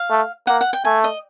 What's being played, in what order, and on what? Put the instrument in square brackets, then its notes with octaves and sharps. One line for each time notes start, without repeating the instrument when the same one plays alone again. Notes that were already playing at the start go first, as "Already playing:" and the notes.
Already playing: [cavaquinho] F5
[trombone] A3
[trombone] A#3 [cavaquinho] F#5
[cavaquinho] F#5
G5
[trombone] A3 [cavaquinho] G#5
[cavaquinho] D#5